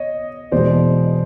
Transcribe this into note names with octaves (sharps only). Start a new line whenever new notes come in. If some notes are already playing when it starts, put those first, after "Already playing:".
Already playing: B3 C#5 D#5
E2 B2 G#3 C5 D5